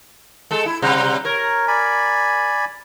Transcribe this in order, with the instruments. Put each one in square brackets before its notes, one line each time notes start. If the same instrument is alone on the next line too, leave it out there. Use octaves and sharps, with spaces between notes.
[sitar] G#3 A4
E4
[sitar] C3 G3 [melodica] C5 F#5
[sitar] A#4 [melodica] C#5
[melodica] D5 G#5 B5